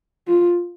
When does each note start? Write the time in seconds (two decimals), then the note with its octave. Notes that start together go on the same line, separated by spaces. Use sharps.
0.28 F4